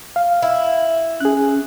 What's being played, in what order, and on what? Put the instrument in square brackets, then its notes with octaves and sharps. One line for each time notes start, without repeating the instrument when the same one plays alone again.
[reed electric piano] F5
[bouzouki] E4
[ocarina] C#4 [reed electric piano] G#4 F#6